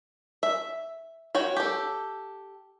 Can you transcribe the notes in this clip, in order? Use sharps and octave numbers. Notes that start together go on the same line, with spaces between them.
E5
F#4 C#5 G5
G4 A4